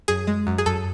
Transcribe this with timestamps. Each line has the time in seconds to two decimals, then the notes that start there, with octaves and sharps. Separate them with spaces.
0.08 F#2 G#4
0.27 G#3
0.47 F#2
0.58 G#4
0.66 F#2 A4